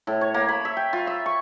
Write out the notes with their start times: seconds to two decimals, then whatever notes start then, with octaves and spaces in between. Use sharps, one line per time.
0.07 A2
0.21 C#5
0.34 A#3
0.48 B5
0.65 E5
0.77 G5
0.93 F4
1.07 E5
1.26 C#6